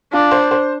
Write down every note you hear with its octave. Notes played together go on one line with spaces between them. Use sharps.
D4 F4
C5
C5